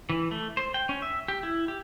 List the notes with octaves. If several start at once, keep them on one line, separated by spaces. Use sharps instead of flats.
E3
A3
C5
G5
C#4
E5
G4
E4
G4